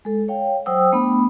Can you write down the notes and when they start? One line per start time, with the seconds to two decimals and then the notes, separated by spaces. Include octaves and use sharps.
0.05 G#3 A4
0.28 C#5 F5 G5
0.66 F#3 C5 F#5 G5 D#6 E6
0.92 A3 B3 D4 B5 D#6